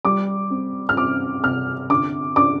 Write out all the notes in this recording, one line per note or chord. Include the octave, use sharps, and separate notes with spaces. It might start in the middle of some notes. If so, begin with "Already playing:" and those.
G3 D6
C4
F6
C4 D6
C3 F6
D3 D6
D4 D6